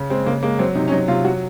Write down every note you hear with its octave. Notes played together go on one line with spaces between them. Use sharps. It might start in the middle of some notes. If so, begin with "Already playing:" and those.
Already playing: C#3
G#3 C4
C#3 A#3
G#3 A#3
F#3 C4
C3 D#4
C#4
F#3 D#4
C3 F4
F#3 F#4